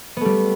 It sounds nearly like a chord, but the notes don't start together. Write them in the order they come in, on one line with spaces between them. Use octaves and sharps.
B3 A3 G3